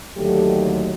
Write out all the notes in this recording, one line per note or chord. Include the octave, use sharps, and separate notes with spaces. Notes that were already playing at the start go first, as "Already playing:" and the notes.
D#2 D3 F#3 A3 G4